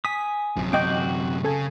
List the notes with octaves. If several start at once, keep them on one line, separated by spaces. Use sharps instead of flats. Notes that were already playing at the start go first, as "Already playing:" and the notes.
G#5 D#6 B6
A1 F#2 C3
C4 F#4 D#5 G5 D6 G6
C#3 A4 G#5